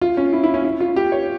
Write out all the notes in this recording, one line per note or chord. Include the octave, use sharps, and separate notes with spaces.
F4
C#4
E4
E4
C#4
E4
F4
G4
C#5